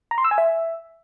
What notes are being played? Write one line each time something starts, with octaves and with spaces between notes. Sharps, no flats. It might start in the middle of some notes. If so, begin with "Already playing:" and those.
A#5
C6
E6
G#5
E5